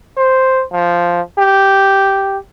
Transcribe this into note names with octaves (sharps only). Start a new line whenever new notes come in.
C5
F3
G4